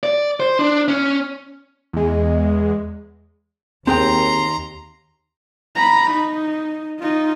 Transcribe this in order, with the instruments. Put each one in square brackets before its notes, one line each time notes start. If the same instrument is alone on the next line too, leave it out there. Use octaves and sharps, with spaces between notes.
[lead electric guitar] D5
C5
D4
C#4
[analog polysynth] E2 G#3
[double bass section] D#2 [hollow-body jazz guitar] C4 G#4 G5 [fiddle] A#5 [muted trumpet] C6
[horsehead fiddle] A#5 B5
D#4
D#4 F4